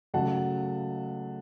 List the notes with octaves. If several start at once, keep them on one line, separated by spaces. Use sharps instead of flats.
C#2 C#3 F#3 A3 F#5 A5